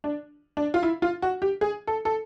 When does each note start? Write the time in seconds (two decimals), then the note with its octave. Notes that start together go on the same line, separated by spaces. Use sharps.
0.04 D4
0.57 D4
0.74 F4
0.83 E4
1.02 F4
1.22 F#4
1.42 G4
1.61 G#4
1.87 A4
2.05 A4